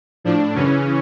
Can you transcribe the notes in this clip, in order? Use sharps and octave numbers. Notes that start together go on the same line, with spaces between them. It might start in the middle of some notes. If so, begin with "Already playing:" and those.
A2 F3 D4
F#2 C#3 E3 C#4